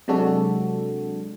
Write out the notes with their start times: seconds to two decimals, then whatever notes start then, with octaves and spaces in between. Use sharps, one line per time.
0.08 C3 F#3 G#3 D4 F#4 A4